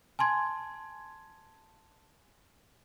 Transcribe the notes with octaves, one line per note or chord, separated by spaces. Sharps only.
G#5 A5 C6 G#6